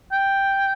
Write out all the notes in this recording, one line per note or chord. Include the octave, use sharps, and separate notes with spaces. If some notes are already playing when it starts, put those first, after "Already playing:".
G5